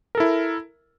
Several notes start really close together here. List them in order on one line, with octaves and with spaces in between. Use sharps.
A#4 A4 E4